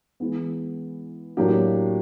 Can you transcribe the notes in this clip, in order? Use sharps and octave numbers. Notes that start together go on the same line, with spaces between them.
E3 G#3 B3
A2 F#3 A#3 D4 G4